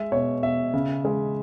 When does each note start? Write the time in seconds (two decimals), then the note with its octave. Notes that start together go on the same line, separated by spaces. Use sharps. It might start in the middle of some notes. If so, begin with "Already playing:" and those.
Already playing: G#3 E5
0.12 B2 C#5
0.43 B2 E5
0.74 C#3
1.05 G#3